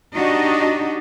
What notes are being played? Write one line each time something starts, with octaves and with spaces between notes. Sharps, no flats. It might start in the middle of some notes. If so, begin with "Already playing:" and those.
D4 D#4 F#4 G4 D#5